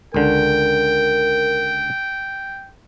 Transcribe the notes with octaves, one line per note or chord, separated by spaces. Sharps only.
C#2 D3 A#4 G5